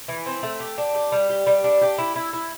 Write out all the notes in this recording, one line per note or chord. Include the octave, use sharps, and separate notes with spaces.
E3
C4
A3
G4
D4
G4
G3
G4
G3
D4
G4
E4
E4
E4